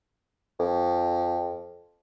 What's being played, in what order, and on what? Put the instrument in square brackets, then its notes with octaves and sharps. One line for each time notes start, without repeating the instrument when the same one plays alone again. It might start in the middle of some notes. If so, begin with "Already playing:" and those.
[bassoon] F2